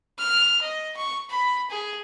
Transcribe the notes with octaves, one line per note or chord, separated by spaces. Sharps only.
F6
D#5
C#6
B5
G#4